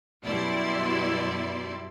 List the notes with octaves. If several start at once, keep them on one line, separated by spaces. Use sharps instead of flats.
F#2 B2 G3 E4 D5 C6